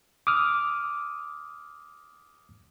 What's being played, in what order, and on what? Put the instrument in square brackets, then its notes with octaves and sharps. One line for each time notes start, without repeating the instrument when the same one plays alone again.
[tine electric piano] D6 D#6 F6